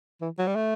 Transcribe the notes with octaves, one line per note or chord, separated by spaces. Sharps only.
E3
F#3
G3
A3